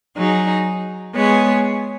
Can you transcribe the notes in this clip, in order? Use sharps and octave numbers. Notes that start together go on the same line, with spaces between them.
F#3 D#4 G#4
G#3 B3 G#4 C#5